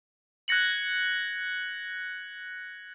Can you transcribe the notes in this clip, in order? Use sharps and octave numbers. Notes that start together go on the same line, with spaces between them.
F#6 G#6 A#6 C#7 F#7